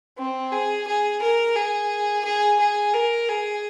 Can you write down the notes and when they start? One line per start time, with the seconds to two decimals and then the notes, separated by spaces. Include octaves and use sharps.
0.18 C4
0.52 G#4
0.88 G#4
1.22 A#4
1.56 G#4
2.25 G#4
2.60 G#4
2.94 A#4
3.29 G#4